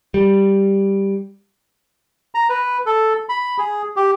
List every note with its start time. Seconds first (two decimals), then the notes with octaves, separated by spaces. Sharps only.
0.14 G3
2.35 A#5
2.49 B4
2.86 A4
3.29 B5
3.58 G#4
3.96 G4